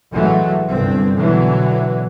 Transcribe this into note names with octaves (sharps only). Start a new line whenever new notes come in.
A1 A2 E3 F#3 G#3 A3
G1 C2 G2 C4
B2 D3 E3 F#3